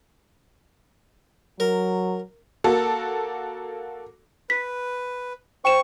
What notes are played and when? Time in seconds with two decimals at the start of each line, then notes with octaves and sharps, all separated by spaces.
1.60 F#3 A#4
2.64 A#3 F#4 A4
4.50 B4 B6
5.65 C5 G5 C#6 E7